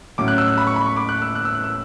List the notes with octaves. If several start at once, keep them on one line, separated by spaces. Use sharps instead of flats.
A2 F#3 C#4 D6
F#6
E6
F#6
B5
C#6
B5
C#6
D6
F#6
E6
F#6
E6
F#6
E6